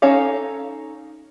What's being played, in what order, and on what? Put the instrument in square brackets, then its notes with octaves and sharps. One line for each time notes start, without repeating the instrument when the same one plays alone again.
[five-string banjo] C#4 D#4 A4 C#5 F5